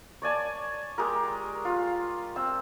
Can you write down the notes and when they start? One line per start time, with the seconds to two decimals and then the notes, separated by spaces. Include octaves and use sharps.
0.22 C#5 D5 G#5 A5
0.98 G#3 G4 A#4
1.65 F4
2.36 C4 E6